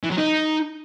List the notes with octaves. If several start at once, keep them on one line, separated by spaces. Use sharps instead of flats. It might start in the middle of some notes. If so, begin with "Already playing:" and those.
E3
F#3
D#4